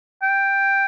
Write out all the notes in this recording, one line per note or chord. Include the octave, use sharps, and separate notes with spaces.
G5